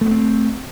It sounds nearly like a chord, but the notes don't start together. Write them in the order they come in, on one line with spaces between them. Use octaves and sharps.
A3 B3 C4